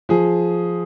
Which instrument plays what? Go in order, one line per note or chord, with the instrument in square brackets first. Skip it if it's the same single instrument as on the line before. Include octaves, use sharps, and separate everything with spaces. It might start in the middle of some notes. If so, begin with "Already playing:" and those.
[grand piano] F3 G#4